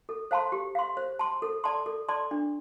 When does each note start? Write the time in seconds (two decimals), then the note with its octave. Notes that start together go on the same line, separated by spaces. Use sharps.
0.09 A4
0.31 C5 F5 A5 C6
0.52 G4
0.75 F5 C6
0.97 C5
1.19 A5 C6
1.42 A4
1.64 D5 A5 C6
1.86 A4
2.09 D5 A5 C6
2.31 D4